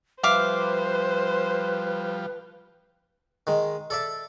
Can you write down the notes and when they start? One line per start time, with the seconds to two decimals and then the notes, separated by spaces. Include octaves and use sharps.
0.23 F3 G3 B4 C5 E5 F5 D6
3.47 D#3 G#3
3.90 A4 D5 E5